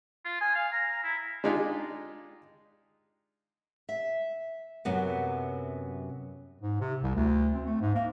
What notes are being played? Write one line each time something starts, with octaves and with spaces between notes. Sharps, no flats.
F4
G#5
F5
A#5
E4
G#3 D4 D#4 F4 G4
E5
F#2 C3 F#3 B3
G#2
C3
C2
D2
C4
A3
G#2
A#3